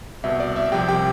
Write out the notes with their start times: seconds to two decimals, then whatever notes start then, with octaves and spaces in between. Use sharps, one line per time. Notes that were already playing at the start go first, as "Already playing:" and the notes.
0.24 C2 B2 E5
0.40 D5
0.56 E5
0.72 C2 C3 F3 G4 G5
0.88 G4 G5